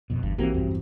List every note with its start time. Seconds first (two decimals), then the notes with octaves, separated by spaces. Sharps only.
0.10 A#1 F2 B2
0.23 G1 E2 G2
0.38 A#1 E3 G3 A#3 C4 F#4 G4
0.54 E2 G2